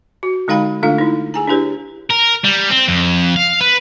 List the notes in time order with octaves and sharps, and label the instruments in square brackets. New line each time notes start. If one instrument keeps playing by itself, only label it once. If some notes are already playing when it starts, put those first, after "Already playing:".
[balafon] F#4
D3 G#3 D#4 F5 G5 B5
D3 A3 D4 F4 F5
D#4 E4
G#4 G#5 A#5
D4 E4 G4 B4 C#5
[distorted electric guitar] A#4
G3
C4
F2
F5
B4